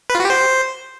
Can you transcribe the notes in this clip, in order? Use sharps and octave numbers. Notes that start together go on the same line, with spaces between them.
B4
F4
F#4
G4
C5